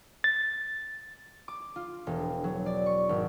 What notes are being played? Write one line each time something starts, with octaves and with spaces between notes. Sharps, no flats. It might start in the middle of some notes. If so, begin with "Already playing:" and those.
A6
D6
F4
E1
F#3
D5
C#6
G#1